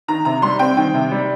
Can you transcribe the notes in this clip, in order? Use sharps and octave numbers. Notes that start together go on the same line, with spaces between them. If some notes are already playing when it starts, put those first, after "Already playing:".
D#3 A#5
C3 A#5
G3 C6
C4 G5
D#3 G5
C3
G3